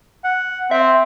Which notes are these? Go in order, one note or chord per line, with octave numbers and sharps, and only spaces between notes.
F#5
C4 E5